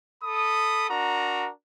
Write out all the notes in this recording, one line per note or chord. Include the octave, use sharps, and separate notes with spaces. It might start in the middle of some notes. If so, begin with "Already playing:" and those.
A4 B5 D#6
D4 F#4 A#4 A#5